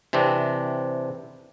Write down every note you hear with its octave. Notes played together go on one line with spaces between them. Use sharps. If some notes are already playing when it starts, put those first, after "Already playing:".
C3 E3 C4 D4